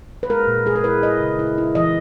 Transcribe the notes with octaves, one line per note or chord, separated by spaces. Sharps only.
B4
G#3 A#4
A#2
G#3 G#4
A#4
E4 B4
E4 D#5
C#3
E4
E4
E3 D#5